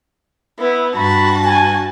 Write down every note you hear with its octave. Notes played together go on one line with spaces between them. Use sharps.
B3 E4
G2 F#4 A5 B5
G#5